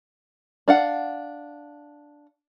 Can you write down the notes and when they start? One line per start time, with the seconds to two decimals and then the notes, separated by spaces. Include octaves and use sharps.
0.68 D4 F5 F#5